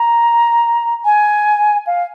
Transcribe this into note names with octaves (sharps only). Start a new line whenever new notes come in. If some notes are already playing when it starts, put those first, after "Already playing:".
Already playing: A#5
G#5
F5